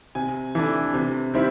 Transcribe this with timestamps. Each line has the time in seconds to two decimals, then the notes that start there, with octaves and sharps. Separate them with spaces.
0.15 C3 G#5
0.55 E3 A3 D4
0.94 C3
1.34 D#3 G3 C4 E4